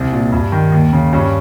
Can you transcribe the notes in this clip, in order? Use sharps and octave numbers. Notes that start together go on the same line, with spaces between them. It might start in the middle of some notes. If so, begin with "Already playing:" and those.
Already playing: C2 C4
A#2
G2
D#3
D#2
C#3
G2 C#4